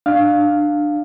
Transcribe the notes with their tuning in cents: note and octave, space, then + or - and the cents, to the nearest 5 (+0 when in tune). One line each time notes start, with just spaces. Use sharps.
D4 +20 F5 +5